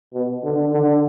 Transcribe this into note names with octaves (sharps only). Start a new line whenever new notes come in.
B2
D3
D3